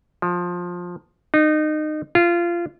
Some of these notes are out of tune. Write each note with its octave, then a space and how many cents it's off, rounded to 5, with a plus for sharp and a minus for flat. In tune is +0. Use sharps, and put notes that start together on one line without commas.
F3 +15
D#4 -25
F4 -20